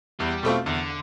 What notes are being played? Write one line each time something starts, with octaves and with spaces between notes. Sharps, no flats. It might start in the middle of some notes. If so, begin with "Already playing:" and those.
E2 G3
B2 A3 C4 F4
E2 D3